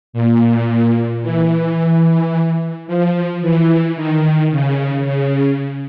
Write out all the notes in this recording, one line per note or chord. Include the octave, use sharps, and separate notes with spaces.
A#2
E3
F3
E3
D#3
C#3
C#3